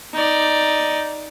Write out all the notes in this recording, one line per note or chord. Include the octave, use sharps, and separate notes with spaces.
D#4 D5